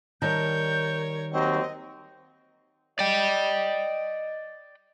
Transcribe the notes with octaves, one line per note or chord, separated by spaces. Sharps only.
D#3 G3 A#4 C#5 A5 G6
D#2 F#3 C4 D#5
D5 D#5 G5